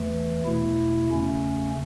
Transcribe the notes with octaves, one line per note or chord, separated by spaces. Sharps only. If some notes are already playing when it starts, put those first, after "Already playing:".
Already playing: E2 E3 A3
E2 B2 A3 E4
E2 C#3 A3 C#4